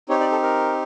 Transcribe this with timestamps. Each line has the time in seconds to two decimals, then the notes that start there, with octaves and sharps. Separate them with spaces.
0.09 C4 D#4 G4 C#5
0.20 D5
0.32 A4
0.43 A#4